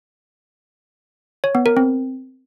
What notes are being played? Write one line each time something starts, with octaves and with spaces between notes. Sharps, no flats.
C#5
B3
A#4
C4